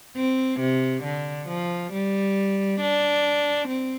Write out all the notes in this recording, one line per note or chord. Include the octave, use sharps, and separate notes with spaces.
C4
C3
D3
F3
G3
D4
C4